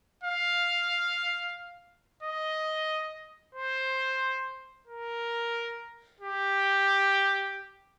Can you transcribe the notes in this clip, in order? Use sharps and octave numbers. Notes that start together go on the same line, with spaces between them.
F5
D#5
C5
A#4
G4